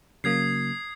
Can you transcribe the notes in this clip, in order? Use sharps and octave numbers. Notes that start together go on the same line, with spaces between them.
C#3 F#3 A#3 D#6 G#6 C7